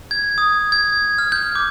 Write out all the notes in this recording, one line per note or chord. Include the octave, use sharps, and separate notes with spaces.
G#6
D#6
G#6
F6
G6
D6